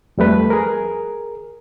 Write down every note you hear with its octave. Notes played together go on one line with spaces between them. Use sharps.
F2 G3 A3 B4
G#4 A#4